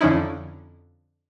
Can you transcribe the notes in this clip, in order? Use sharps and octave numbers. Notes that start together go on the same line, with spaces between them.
F2 D3 F3 C#4 D#4 E4